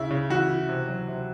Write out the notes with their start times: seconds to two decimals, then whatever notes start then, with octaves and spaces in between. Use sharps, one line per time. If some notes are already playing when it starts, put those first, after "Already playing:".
Already playing: C#3 E4
0.10 C#3
0.30 E3 F#4
0.49 E3
0.69 C3
0.88 F#3
1.08 C3